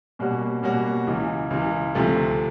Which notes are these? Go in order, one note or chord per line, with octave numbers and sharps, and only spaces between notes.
B2 G3 A#3 C#4 F#4
B2 G3 A#3 C#4 F#4
C#2 C#3 E3
C#2 C#3 E3
D2 C3 F3 A3